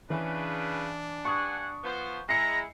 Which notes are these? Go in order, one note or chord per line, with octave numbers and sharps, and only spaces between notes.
C#3 E3 D4 B4
G2 F#5 G#5 C#6 D#6
F3 B3 C5
G#3 E4 A#5 A#6 C7 C#7